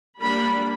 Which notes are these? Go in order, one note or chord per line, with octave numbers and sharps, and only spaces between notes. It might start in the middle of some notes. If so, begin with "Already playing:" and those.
G3 A#3 D4 B5